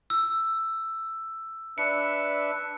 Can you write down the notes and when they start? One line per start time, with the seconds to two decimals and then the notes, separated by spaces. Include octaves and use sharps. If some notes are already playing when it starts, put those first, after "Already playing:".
0.10 E6
1.78 D4 B4 E5 C#7